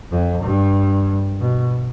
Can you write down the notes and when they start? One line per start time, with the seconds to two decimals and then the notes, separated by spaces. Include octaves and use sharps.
0.11 F2
0.44 G2
1.40 B2